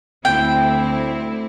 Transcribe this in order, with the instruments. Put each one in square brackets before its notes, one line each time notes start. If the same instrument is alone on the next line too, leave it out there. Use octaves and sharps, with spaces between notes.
[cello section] D2 C4 E4 [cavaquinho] G5